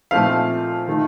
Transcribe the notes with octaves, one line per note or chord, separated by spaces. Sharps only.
A#2 F3 A3 C4 D#4 F5
D#3 A3 D#4